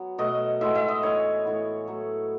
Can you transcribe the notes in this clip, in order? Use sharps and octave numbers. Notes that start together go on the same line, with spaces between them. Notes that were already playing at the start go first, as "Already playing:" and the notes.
Already playing: F#3 B3
B2 A3 D#5
A2 G#3 B3 E5
E5
D#5
A2 E3 B3 C#5
A2 E3 B3
A2 F#3 A3